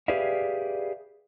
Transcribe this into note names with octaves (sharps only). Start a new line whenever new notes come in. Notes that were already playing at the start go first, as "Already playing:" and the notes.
G4 G#4 B4 D5 E5 F5